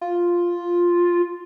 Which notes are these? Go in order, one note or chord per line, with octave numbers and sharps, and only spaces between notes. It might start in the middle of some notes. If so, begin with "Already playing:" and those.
F4